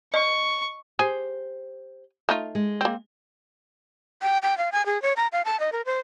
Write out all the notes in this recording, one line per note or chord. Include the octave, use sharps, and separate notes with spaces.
D#5 C#6
G4 G#4 C5
A3 D#4 F4
G#3
A#3 C4
G5
G5
F5
G#5
G#4
C#5
A#5
F5
A5
D#5
A#4
C5